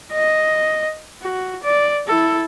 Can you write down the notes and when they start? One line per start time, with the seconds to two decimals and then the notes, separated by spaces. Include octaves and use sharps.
0.13 D#5
1.22 F#4
1.63 D5
2.08 E4 A4